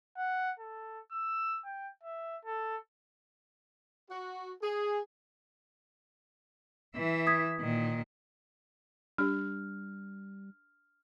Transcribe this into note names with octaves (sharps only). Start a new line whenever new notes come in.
F#5
A4
E6
G5
E5
A4
F#4
G#4
E3 E5
D#6 G#6 B6
A#2 D#3
G3 D4 G4 F6